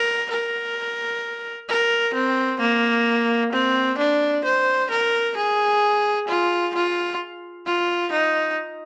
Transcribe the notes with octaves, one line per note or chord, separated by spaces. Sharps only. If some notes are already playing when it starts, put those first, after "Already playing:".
Already playing: A#4
A#4
A#4
C4
A#3
C4
D4
C5
A#4
G#4
F4
F4
F4
D#4